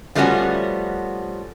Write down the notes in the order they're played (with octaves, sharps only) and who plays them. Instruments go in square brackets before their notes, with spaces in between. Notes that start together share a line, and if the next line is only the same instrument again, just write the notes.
[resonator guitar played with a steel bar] F3 G3 A3 B3 C#4 F#4